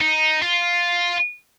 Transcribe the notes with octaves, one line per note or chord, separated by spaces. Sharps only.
D#4
F4